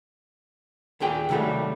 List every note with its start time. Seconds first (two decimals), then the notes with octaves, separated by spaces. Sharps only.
1.00 D#2 A#2 G#4 G5
1.29 C3 D#3 F#3 G3 A3